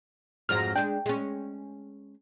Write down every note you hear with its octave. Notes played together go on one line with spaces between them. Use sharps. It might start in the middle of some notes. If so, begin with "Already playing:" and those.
F2 G#2 F#3 F6 A#6
G#3 D4 G5
G#3 C#4